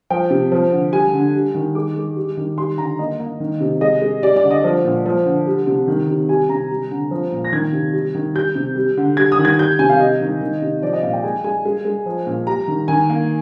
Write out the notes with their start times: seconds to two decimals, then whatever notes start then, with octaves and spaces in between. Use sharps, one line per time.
0.10 F3 G5
0.30 C3
0.52 F3
0.72 D3
0.92 G3 G#5
1.13 D3
1.35 G3
1.55 D#3
1.75 G#3 D6
1.96 G#3
2.16 G3
2.37 D#3
2.58 G3 C6
2.78 D3 A#5
2.99 A#3 D#5
3.20 A#3
3.40 D#3
3.61 C3
3.81 G#3 D#5
4.02 G#3
4.22 G3 D5
4.36 D5
4.44 D3
4.51 D#5
4.64 F3
4.85 A#2
5.06 F3
5.26 D3
5.47 G3
5.67 C3
5.88 D#3
6.08 C3
6.29 G3 G#5
6.49 C3 A#5
6.71 G3
6.91 D3
7.11 F3
7.32 A#2
7.44 A#6
7.52 D#3 G#6
7.73 C3
7.93 G3
8.15 D#3
8.34 G3 G6
8.55 C3
8.76 G3
8.97 D3
9.17 G3 G#6
9.32 D#6
9.39 D#3
9.45 G#6
9.58 G3 G6
9.79 C3 G#5
9.89 F5
10.00 G3 D#5
10.21 D#3
10.41 D#3
10.62 C3
10.82 F3 D5
10.93 D#5
11.03 A#2 F5
11.13 G5
11.24 G#3 G#5
11.44 G#3 G#5
11.65 G#3
11.85 G#3
12.06 F3
12.27 A#2
12.47 G3 A#5
12.68 D#3
12.88 D#3 G#5
13.10 A#3